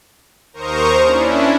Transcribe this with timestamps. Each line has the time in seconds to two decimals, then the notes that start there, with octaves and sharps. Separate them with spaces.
0.53 D#2 A#4 C5 A#5 C#6 D#6
1.02 C#4 D4 E4